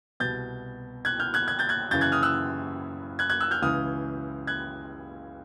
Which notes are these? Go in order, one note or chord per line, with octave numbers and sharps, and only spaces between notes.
C2 B2 G6 A6
F#6 G#6
F6 G6
F#6 G#6
F#6 G#6
G6 A6
F#6 G#6
F#2 C#3 E3 G6 A6
F#6 G#6
D#6 F6
E6 F#6
F#6 G#6
F#6 G#6
E6 F#6
F6 G6
C#2 C#3 E3 D#6 F6
F#6 G#6